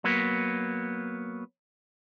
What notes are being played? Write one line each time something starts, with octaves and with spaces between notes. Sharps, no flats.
F#3 A#3 B3